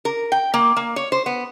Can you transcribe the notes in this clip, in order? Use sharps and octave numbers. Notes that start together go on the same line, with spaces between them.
A#4
G5
A#3
A#3
C#5
C5
B3